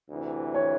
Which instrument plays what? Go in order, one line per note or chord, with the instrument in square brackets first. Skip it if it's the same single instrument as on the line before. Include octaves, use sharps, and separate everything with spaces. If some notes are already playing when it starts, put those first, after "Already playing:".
[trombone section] D2 C3 E3
[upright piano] C#5